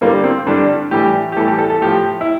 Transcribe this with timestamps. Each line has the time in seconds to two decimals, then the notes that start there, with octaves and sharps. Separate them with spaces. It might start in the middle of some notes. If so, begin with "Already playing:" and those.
0.01 G2 D3 G3 A#3
0.24 C4
0.47 G2 D3 G3 D4
0.91 A2 E3 G3 G4
1.32 G4
1.37 A2 E3 G3 A4
1.48 G4
1.58 A4
1.70 A4
1.81 A2 F3 G4
2.21 E4